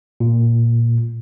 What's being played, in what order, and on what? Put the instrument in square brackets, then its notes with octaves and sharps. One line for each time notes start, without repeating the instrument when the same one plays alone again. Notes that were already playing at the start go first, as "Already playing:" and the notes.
[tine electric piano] A#2